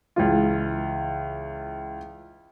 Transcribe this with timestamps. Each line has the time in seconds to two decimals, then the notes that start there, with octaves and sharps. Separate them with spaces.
0.16 C#2 E3 F4